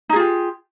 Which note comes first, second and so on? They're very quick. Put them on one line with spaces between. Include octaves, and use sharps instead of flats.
D#4 G#4 F4 G4